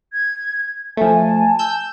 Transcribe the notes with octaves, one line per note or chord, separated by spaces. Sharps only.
G#6
F3 A3 G#5 A5
E6 G6 E7